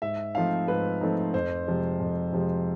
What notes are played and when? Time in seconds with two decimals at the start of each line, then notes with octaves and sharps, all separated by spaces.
0.02 G#2 E5
0.35 F3 A3 C4 D#4 F5
0.68 G#2 B4
1.01 F3 A3 C4 D#4
1.34 F2 C5
1.67 C3 F3 G#3
2.00 F2
2.33 C3 F3 G#3